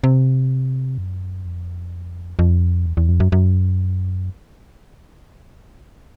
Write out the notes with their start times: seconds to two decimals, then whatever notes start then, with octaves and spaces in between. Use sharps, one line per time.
0.04 C3
0.98 F#2
1.45 F2
2.39 F2
2.86 E2
2.97 E2
3.09 F2
3.20 F#2
3.32 F#2